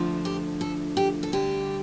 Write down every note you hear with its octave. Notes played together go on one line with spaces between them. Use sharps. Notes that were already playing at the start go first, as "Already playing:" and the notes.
Already playing: D2 D3 F3 A3
G4
A4
G4
A4
D2 D3 G3 G4